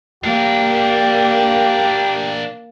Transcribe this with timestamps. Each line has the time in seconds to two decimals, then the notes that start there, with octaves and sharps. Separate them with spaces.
0.24 A#3 D4 G4 A#4